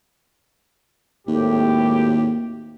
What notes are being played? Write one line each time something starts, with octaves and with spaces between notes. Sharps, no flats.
G#1 D#2 A2 G4